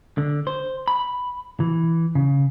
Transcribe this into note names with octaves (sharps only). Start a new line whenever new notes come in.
D3
C5
B5
E3
C#3